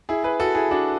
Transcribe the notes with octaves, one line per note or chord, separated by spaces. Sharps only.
E4 G#4
G#4 B4
F#4 A4
E4 G#4
D4 F#4